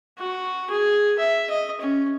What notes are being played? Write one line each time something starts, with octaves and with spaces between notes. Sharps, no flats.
F#4
G#4
E5
D#5
C#4